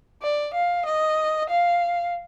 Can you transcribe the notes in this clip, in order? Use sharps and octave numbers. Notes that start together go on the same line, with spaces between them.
D5
F5
D#5
F5